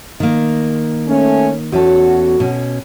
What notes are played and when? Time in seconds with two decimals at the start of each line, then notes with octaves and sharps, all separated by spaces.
0.20 D#3 A#3
1.07 A3 C#4
1.72 E2 C#4 F#4 A4
2.40 B2 C#4